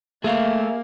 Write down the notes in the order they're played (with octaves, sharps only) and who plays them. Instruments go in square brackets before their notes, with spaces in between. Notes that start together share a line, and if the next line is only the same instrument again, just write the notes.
[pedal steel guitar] A3 [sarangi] A#3 [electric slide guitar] G#4 E5 F5